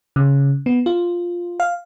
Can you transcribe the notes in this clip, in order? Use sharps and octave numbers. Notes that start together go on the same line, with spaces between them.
C#3
B3
F4
F5